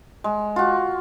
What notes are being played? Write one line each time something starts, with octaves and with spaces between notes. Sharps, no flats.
G#3
F4 F#4